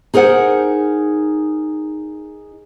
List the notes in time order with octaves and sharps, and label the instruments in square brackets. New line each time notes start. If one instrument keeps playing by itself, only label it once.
[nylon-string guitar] D#4 G#4 A#4 C5 F#5